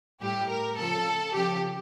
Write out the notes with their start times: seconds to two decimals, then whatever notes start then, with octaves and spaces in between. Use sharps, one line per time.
0.21 A2 G3 G4
0.49 A#4
0.78 C#3 F3 A4
1.34 C#3 F3 G4